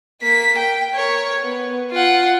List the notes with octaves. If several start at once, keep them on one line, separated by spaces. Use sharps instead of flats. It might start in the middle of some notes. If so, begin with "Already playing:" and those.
A#3 B6
G5
A#4 C#5
B3
F4 F#5